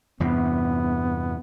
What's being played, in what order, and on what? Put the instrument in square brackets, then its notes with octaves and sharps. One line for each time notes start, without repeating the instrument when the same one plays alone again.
[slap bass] E2 G2 C3 [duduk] B3